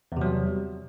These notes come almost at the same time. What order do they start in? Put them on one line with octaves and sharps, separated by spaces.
E2 C3 F#3 G3